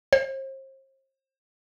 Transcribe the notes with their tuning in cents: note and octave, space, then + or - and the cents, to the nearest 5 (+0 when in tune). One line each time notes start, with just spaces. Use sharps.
C5 +40